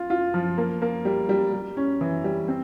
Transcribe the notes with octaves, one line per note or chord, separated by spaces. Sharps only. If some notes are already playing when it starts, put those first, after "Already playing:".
Already playing: F4
F4
F3
A#3
A#3
G3
G3
G3
C#4
E3
G3
C4